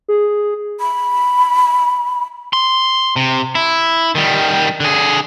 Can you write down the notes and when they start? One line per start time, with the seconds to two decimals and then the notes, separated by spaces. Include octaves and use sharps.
0.08 G#4
0.79 B5
2.53 C6
3.16 C3
3.55 E4
4.15 D#3 G3
4.80 D3 G#4